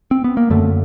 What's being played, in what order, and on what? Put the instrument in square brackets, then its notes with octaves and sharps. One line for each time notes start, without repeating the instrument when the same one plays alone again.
[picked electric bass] C4
B3
A#3
F#2 D3 A3